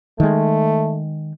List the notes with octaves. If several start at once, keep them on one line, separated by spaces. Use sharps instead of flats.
D#3 G#3 A3